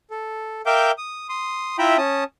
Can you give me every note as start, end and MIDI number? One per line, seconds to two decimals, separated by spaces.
0.11 0.61 69
0.66 0.91 70
0.66 0.91 76
0.66 0.91 77
0.66 0.91 79
0.66 0.91 86
0.66 0.91 91
0.98 1.27 87
1.29 1.77 84
1.29 1.77 87
1.79 1.97 64
1.79 1.97 65
1.79 1.97 76
1.79 1.97 79
1.79 1.97 82
1.79 1.97 83
1.98 2.24 61
1.98 2.24 81
1.98 2.24 87